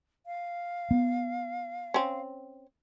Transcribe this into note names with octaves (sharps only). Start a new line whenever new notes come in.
F5
B3
C4 C#4